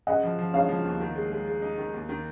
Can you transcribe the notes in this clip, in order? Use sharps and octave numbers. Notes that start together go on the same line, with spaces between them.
C#3 D#5 F#5
F3
F3
C#3 C#5 F5
F3
D#2
D#3
G#3
G#3
G#3
D#4
D#3
D#2
D#3